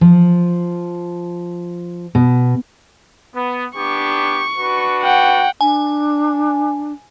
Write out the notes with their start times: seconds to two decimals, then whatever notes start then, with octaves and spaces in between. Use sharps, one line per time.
0.01 F3
2.15 B2
3.33 B3
3.76 B3 D4 G4 C#6
4.57 D4 F#4 B4
5.02 F#5 G5
5.61 D4 G#5